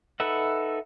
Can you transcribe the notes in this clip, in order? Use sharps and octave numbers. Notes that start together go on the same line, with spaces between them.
D#4 A4 B4 E5 F#5